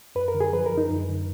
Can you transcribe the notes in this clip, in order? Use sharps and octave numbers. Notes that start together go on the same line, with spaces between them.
F#2 B4
A#4
D3
G#4
F3 B4
A#4
F#2
D#4
F#2
D3